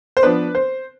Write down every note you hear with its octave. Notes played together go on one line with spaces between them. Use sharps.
C5
F3 B3 D4 B4
C5